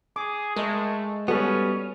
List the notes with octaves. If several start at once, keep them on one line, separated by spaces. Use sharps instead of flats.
G#4 D6
G#3 A3 A#4 D#5
G3 B3 C#4 F#4 A4 C#6